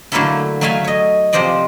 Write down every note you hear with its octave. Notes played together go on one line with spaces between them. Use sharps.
D3 F#3 A3 A#3 E4 A4
F#3 A3 A4 E5 F5 G#5
C#5 D#5
C3 F3 C5 D5 D#5